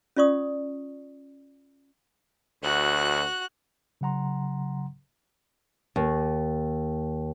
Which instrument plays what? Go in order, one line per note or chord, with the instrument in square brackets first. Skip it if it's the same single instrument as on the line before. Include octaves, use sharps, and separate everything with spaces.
[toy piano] C#4 F4 D5 C#6 D#6
[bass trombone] D2 [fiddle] F#4 F#6
[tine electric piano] C#3 F#3 F#5 A#5 C6
[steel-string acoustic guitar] D#2